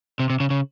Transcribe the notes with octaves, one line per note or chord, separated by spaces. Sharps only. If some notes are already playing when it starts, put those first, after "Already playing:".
C3
C3
C#3
C#3